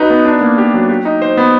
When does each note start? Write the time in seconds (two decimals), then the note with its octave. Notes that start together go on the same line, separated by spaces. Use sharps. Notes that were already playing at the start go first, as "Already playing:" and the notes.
Already playing: D#4 F#4 B4
0.10 B3
0.25 D4
0.41 A#3
0.58 G4
0.74 F#3
0.89 G4
1.05 D#4
1.22 C5
1.37 B3